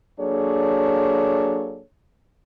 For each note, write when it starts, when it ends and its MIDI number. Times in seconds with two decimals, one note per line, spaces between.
0.19 1.81 54
0.19 1.81 58
0.19 1.81 62
0.19 1.81 68
0.19 1.81 69
0.19 1.81 73